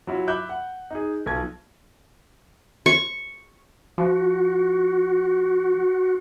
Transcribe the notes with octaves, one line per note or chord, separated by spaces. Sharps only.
F#3 E4 F4
E5 B5 D6 F#6 G6
F#5
D#4 G#4
B1 F4 G#6
C#6
F3 F#4